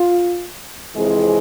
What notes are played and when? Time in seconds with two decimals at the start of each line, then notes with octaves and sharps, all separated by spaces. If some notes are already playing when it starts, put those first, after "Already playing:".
Already playing: F4
0.95 F2 C3 E3 G#3 G#4